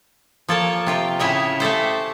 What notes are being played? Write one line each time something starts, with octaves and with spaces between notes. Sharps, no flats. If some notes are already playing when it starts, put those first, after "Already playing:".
F3 A#3 A4 A#4 C#5 A5
C3 F4 G5
A2 C#3 E4 C#5 D#5
A3 G4 A4 C5